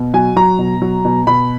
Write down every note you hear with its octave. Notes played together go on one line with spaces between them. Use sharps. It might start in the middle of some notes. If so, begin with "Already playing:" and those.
Already playing: B2
F#3 G#5
F#3 A#5
B2
F#3
B2
B2 B5